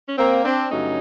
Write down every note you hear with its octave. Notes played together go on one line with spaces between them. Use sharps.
C#4
A#3 C4
C4 D4
G2 D3 F#3 A3 C#4 D#4